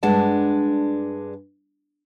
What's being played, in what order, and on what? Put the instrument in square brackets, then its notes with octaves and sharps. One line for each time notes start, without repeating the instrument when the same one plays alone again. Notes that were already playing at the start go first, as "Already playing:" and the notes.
[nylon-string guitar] G2 G#3 D4 F#5 A5